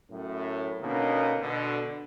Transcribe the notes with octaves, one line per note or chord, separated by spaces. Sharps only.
F#2 A2
B2 D3 A#3 C#4 D#4
B2 D3